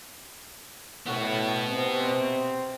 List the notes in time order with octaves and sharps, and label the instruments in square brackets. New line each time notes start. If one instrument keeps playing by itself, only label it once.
[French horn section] A2 [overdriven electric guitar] B3 F#4
[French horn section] C3 C4